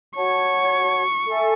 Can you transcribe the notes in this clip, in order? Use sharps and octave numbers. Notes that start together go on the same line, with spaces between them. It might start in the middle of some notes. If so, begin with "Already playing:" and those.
F#4 C#5 F#5 A5 C#6
A4 E5 G#5